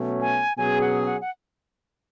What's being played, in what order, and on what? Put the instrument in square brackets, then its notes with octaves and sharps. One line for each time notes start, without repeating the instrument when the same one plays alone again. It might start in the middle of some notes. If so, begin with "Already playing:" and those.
Already playing: [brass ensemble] B2 F#3 A3 C#4
[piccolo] G#5
[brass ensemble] B2 F#3 C#4 G#4 [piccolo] G#5
[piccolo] F#5
G#5
F#5
F#5